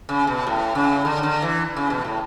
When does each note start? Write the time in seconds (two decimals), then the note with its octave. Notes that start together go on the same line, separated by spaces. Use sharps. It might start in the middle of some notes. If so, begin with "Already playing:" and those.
0.09 C#3
0.27 B2
0.47 A2
0.75 C#3
1.05 D3
1.23 D3
1.42 E3
1.77 C#3
1.90 B2
2.04 A2